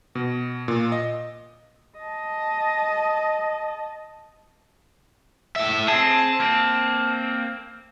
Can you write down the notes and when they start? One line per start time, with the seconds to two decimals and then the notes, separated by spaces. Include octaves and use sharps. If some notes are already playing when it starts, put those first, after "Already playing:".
0.15 B2
0.68 A#2
0.92 D#5
1.99 D#5 A5
5.56 A2 E5
5.88 C4 G#4 A5
6.40 A#3 C4